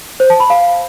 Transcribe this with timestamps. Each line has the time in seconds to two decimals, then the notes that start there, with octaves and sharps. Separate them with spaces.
0.20 C5
0.30 A5
0.40 B5
0.50 F5